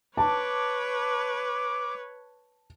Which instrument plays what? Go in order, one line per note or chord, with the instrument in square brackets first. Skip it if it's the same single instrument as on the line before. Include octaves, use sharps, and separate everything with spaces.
[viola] B4 C#5 [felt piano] A5 [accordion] D6